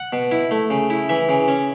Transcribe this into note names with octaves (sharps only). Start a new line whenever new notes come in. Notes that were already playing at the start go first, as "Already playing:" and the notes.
Already playing: F#5
B2
E4
A3
C#3
E4
E3 E5
C#3
C#4